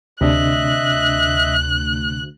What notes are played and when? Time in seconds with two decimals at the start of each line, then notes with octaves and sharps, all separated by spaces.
0.21 D2 C3 D4 D#5 E5 F#6